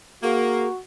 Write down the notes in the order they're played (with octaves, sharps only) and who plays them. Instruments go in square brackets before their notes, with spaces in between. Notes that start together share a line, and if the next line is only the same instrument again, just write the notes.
[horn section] A#3 [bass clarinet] F#4 [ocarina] G#4